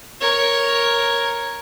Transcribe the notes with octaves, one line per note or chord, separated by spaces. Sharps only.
A#4 C#5